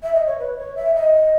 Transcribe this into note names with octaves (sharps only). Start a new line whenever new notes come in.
E5
D#5
C#5
B4
C#5
E5
D#5